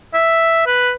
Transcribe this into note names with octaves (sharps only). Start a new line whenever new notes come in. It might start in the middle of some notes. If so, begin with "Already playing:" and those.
E5
B4